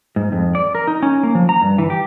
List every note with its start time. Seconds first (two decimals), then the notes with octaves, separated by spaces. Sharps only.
0.16 G#2
0.32 F2
0.55 D5
0.75 A#4
0.87 D#4
1.03 C#4
1.23 A#3
1.35 F3
1.49 A#5
1.62 G2
1.78 E3
1.90 G4